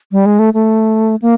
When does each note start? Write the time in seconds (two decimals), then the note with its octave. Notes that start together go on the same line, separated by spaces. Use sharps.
0.12 G3
0.26 G#3
0.39 A3
0.54 A3
1.22 A#3